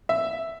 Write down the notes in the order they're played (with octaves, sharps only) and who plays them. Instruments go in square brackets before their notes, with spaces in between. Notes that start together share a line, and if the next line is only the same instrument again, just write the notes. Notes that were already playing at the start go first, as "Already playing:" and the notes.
[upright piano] E5